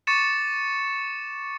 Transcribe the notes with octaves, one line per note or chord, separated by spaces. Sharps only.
C#6 D6 A6 C#7 E7